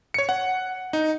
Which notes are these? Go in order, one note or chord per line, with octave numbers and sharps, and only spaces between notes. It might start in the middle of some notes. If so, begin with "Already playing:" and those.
C#5 C#7
F#5
D#4